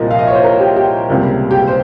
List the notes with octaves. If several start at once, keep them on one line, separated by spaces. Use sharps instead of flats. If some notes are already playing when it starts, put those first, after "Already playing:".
Already playing: C2 A#2 F3 A#3 D#5
F5
D#5
C#5
C5
A#4
G4
G4
C#2 C3 G3 A#3
G4
C5